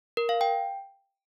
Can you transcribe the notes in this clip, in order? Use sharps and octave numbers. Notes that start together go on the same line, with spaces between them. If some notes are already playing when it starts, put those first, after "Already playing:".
A#4
F5
G5